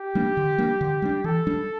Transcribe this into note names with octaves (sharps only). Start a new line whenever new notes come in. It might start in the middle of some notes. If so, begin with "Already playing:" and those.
Already playing: G4
G3 A#3 D4
D3
G3 A#3 D4
D3
G3 A#3 D4
E3 A4
G3 D4